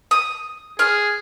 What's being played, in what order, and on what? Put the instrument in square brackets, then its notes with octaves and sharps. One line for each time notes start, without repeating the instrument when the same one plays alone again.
[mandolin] D#6
[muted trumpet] G#4 [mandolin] F6